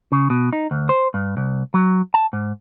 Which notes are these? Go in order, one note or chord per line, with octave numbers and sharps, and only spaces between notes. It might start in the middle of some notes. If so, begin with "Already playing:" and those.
C#3
B2
D#4
D2
C5
G2
C2
F#3
A5
G#2